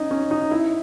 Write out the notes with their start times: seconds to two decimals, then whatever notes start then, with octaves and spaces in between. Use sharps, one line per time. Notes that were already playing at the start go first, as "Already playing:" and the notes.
Already playing: C#4 D#4
0.11 C#4
0.31 D#4
0.51 E4